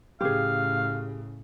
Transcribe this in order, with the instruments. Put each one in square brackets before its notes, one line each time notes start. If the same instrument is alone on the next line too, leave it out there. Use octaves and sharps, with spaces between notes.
[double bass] A2 C#3 [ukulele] G4 G#4 [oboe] F5